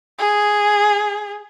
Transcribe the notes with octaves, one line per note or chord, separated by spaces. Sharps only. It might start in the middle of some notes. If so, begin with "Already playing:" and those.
G#4